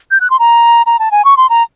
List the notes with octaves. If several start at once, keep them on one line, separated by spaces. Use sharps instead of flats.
G6
F#6
C6
A#5
A#5
A5
G#5
C#6
C6
A#5